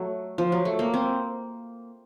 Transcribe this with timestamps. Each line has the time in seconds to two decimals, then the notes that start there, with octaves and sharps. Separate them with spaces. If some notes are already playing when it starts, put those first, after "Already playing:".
Already playing: F#3 A3
0.38 F3
0.52 F#3
0.65 A3
0.79 A#3
0.94 C4